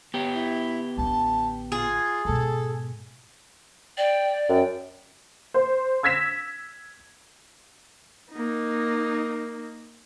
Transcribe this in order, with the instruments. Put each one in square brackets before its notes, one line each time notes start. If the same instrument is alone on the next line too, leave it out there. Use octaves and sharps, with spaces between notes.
[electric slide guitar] B3 G4 [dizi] C#5
[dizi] E4
[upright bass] A1 D3 [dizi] A5
[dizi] F4 [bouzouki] G#4
[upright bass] G#2 B2 [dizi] A4
[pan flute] D5 [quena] G5
[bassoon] F#2 [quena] G5
[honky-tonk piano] C5
E6 G#6 A#6 B6 E7
[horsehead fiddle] A#3 D#4